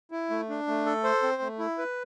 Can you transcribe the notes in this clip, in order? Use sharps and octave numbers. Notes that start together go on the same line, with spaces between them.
E4
A3
D4
A3
A4
C5
C4
A3
E4
B4